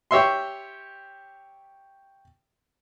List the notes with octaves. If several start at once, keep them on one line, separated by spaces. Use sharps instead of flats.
G4 C#5 E5 C6